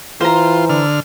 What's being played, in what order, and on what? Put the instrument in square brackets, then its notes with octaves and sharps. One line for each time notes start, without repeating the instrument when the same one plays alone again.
[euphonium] E3 [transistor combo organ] F4 [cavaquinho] C5 A#5
[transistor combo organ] D3 F6